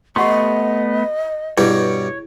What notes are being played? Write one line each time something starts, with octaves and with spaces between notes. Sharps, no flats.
A3 B3 G4 D#5 F#5 C6 C#6
G2 B2 G3 E4 G#4 C#5